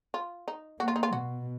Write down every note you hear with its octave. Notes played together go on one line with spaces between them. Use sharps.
F4
D#4
A#3 F#4
F4
D#4
F4
B2 F#4